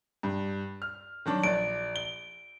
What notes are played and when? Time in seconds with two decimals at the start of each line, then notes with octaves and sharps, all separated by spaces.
0.23 G2
0.82 F6
1.26 D#3 F#3 D4
1.44 A#1 D5 D7
1.96 G7